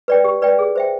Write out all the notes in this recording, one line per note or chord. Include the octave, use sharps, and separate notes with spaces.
B4 D5 G5
G4
B4 D5 G5
G#4
C5 E5 G5